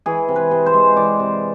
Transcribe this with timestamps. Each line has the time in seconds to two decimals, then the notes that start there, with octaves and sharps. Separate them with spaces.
0.06 E3 G#4
0.28 C3
0.36 B4
0.51 C3
0.66 C5
0.74 G#3
0.96 E3 D5
1.20 C3